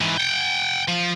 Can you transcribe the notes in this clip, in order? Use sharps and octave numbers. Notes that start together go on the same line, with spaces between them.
G#2 E3
F#5 G5
F3